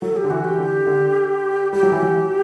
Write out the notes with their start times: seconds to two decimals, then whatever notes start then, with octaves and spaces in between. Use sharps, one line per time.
0.02 F#3 A4
0.16 G4
0.24 D3
0.30 E3 F#4
0.45 G4
0.58 D3
0.87 D3
1.72 G3 G4
1.83 F#3
1.92 E3
2.02 F#3